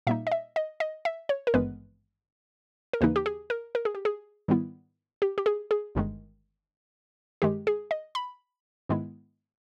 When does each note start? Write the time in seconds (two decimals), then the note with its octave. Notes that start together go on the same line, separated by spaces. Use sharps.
0.07 A#2 G3 A#3 D#4 E5
0.27 D#5
0.32 E5
0.56 D#5
0.80 D#5
1.05 E5
1.29 C#5
1.47 A#4
1.54 G#1 G2 E3 G#3 B3 B4
2.93 A#4
3.01 D#2 C#3 E3 A#3 D#4 B4
3.16 G4
3.26 G#4
3.50 A#4
3.75 A#4
3.85 G#4
3.95 G4
4.05 G#4
4.48 G#2 D#3 G3 B3 E4
5.22 G4
5.38 G4
5.46 G#4
5.71 G#4
5.95 G1 G2 D#3 G#3
7.42 G2 D#3 G#3 G4
7.67 G#4
7.91 D#5
8.15 B5
8.89 G#2 D#3 G#3 B3 E4